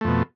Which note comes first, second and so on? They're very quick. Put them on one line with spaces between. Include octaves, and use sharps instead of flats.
A3 F2 B2